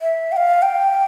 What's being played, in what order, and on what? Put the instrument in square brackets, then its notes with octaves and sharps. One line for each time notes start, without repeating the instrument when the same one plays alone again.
[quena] E5
G5
F5
G5